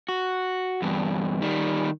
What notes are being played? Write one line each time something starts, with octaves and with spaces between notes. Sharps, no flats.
F#4
E2 G2
D#3 G3